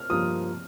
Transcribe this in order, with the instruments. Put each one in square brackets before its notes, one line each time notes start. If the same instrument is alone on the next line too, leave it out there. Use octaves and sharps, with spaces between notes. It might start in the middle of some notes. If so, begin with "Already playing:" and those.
Already playing: [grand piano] F6
[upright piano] G2 F3 A#3 F4 [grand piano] D#6